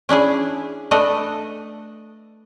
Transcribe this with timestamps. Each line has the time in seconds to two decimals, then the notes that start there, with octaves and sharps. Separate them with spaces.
0.09 C#4 D4 E4 G#4
0.91 A3 D4 A4 B4 D#5